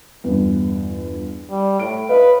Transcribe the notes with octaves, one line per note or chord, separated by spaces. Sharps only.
G1 E2
G3
A2 D7
B4 C#5 D#5 F5